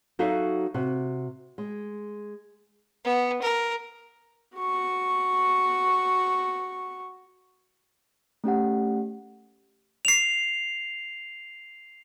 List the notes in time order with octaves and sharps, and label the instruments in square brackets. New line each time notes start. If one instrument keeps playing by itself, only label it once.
[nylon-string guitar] F#3 D#4 F#4 A4 E5 F5
C3 F#4
G#3
[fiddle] B3
A#4
[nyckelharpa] F#4 C#6
[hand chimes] A3 C#4 G4 F#5
[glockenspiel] C7 F7